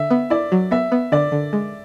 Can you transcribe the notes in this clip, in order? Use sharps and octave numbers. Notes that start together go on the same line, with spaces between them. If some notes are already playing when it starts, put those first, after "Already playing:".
Already playing: D3 E5
B3
E4 D5
F#3
B3 E5
B3
D3 D5
D3
G#3